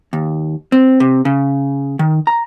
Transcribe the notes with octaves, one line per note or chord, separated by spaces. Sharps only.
D#2
C4
C3
C#3
D#3
A#5